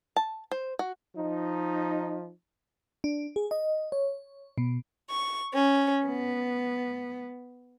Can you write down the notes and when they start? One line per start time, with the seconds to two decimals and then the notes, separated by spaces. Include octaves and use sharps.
0.16 A5
0.51 C5
0.79 F#4
1.16 F3 D#4
3.04 D4
3.36 G#4
3.51 D#5
3.92 C#5
4.58 B2
5.10 C#6
5.53 C#4
6.06 B3